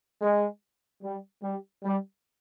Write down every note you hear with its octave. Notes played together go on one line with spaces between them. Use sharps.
G#3
G3
G3
G3